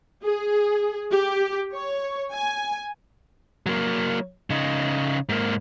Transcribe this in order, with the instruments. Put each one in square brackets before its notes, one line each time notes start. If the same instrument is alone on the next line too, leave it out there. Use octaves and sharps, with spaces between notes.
[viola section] G#4
G4
C#5
G#5
[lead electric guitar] F#3 A#3
C#3 D#4
G#2 A#3